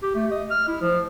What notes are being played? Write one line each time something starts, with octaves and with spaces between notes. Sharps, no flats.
G4
A3
D#5
F6
E4
F3